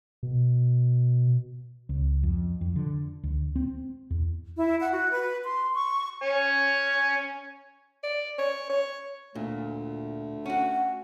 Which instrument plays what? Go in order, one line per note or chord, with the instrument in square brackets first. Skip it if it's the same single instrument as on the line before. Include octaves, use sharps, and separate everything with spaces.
[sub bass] B2
[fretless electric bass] C#2
F2
F2
D3
D2
C4
E2
[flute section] E4
F#5
F#4
B4
C6
C#6
[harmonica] C#4 C#5 G#5
[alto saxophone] D5
C#5
C#5
[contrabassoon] D2 [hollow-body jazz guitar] A#2 [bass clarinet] A3
[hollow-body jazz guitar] C#4 F#4 [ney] F#5